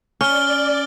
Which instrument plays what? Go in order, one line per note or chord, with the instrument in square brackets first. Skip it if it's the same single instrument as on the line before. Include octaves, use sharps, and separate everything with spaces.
[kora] C#4 [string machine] D5 [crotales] F6 G7